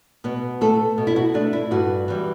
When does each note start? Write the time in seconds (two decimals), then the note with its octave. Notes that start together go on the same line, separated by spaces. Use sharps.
0.24 B2 B3
0.61 A3 A4
0.98 B2
1.07 E4
1.16 F#4
1.34 A3 D4
1.53 E4
1.71 G2 F#4
2.08 E3 G3